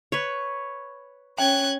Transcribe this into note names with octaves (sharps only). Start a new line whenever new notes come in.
B4 C#5
C#4 G5 F#6 G#6